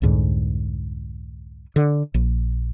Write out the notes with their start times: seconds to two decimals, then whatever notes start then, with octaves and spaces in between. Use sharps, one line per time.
0.02 C2 F2 G#2 D3
1.76 D3
2.14 A#1